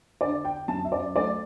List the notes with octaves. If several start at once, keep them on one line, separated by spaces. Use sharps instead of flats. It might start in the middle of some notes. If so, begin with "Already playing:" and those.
D3 D5
G5
F#2 A5
E5
D5
A3 D5